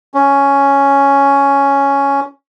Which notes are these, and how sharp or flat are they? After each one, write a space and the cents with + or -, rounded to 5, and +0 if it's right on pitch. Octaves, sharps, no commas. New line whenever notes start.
C#4 +5